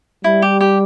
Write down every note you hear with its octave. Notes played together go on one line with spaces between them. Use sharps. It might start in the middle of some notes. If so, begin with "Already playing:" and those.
G3 E4
G4
G4